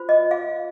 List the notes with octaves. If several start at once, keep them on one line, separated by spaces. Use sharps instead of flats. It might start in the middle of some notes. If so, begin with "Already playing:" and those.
Already playing: F4 C5
D#5
F5